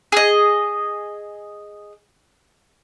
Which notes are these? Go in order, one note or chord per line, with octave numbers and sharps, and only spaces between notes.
G#4 D#5